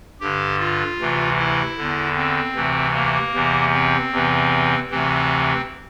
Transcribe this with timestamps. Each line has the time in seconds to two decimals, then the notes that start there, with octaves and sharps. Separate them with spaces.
0.21 G2 D3 G4
0.59 F4
0.99 D2 C3 E3
1.38 E4
1.78 E2 D3
2.16 C4
2.55 D2 C3 E3
2.95 A#3
3.34 E2 C3 E3
3.73 C4
4.12 E2 C3 E3
4.90 D2 C3 E3 C4